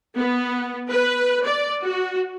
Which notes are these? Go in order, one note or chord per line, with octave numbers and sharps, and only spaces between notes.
B3
B4
D5
F#4